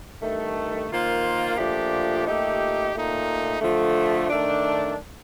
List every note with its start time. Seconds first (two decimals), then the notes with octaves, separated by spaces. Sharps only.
0.22 G2 D#3 A3
0.90 D#3 A#3 F4 C5
1.57 A#2 F3 A3 D4 G4
2.25 A#2 A3 D#4 G4
2.94 A#2 A3 D#4
3.61 D3 F3 A3
4.29 D#3 A3 D4